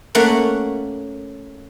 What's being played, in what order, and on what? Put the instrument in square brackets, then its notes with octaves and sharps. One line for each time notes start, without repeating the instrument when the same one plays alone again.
[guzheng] A3 A#3 C#4 F#5